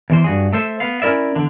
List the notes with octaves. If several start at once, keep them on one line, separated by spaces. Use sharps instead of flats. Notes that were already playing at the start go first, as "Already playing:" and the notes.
E2 E3 C5
G2 F#4 G#4
A3 A4 C5 E5
B3 F5
C#4 E4 A#4 D5 E5
E2 D3 D4